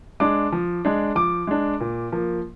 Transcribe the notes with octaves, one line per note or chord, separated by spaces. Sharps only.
G#3 D4 D6
F3
G#3 D4
F3 D6
G#3 D4
A#2
F3 A#3